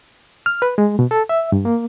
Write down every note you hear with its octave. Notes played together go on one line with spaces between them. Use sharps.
F6
B4
G#3
B2
A4
E5
G2
A#3